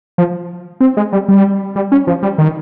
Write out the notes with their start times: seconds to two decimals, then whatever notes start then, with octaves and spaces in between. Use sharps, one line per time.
0.18 F3
0.80 C4
0.97 G#3
1.13 G3
1.28 G3
1.76 G3
1.92 C#4
2.07 F3
2.23 G3
2.38 D#3